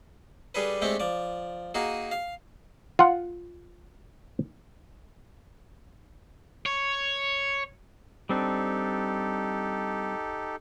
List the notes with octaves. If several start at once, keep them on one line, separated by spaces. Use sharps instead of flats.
G3 D4 G#4 A4 B4
G#3 A3 C4 D4 G4 A4
F3 D5
A#3 D#4 F#4 G#4
F5
F4 F#5
C#5
G3 C4 D4 D#4 G4 A4